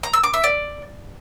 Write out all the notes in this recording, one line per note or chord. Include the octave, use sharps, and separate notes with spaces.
A#5
E6
D6
E5
D5